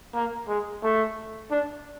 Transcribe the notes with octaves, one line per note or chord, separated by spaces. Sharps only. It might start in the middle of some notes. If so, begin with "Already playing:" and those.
A#3
G#3
A3
D4